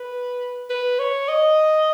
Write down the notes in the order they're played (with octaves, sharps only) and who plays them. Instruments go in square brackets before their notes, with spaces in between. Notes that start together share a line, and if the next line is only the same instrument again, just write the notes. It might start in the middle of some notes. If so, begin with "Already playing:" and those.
Already playing: [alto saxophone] B4
B4
C#5
D#5